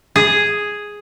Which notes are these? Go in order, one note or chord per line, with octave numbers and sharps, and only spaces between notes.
G#4